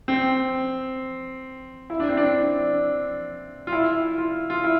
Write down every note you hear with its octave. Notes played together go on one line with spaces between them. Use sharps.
C4
E4
D4
C4
D4
F4
E4
F4
F4
E4